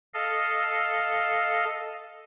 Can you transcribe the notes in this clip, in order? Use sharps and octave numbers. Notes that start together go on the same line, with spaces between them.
A4 D#5 F5